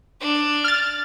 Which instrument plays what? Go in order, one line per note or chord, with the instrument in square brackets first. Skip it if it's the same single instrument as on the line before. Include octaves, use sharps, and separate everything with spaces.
[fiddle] D4
[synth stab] F6 A6